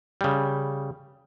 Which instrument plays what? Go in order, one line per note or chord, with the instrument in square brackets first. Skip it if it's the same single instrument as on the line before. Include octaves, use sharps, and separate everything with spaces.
[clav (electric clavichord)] C#3 G3